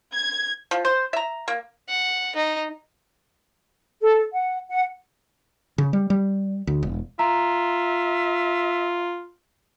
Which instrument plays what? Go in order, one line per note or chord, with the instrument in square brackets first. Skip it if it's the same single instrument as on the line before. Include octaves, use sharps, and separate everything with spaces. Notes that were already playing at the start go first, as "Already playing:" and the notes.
[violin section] G#6
[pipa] F3
C5
E5 A#5
A#3
[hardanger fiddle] F#5
D#4
[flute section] A4
F#5
F#5
[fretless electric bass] C#3
G3
G3
D2
E1
[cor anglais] F4 [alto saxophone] E5 [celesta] A#5